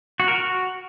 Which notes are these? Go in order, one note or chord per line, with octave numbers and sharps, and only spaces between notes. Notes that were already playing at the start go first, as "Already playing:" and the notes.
F#4
A#4
F#4